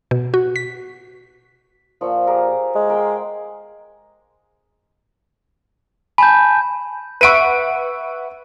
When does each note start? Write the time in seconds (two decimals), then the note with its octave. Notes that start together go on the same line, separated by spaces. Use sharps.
0.11 B2
0.34 F#4
0.56 B6
2.01 A#2 F3 C#6 E6
2.27 G4 G#4 A#4
2.75 G#3
2.90 A#4 G5 C6
6.18 G#5 A5 B5 G6
7.21 B4 E5 F#5 C#6 D7 D#7